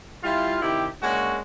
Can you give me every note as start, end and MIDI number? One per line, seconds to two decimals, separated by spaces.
0.23 0.61 55
0.23 0.61 64
0.23 0.61 65
0.62 0.86 48
0.62 0.86 51
0.62 0.86 64
0.62 0.86 67
1.02 1.39 56
1.02 1.39 58
1.02 1.39 61
1.02 1.39 62
1.02 1.39 66